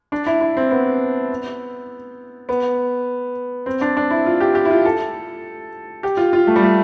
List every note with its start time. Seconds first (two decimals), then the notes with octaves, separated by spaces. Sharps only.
0.12 D4
0.26 E4
0.41 E4
0.57 C4
0.71 B3
2.49 B3
3.66 C4
3.81 D4
3.97 D4
4.10 E4
4.26 F4
4.40 G4
4.55 G4
4.65 E4
4.70 F4
4.85 A4
6.03 G4
6.17 F4
6.33 F4
6.47 A3
6.56 G3
6.62 A3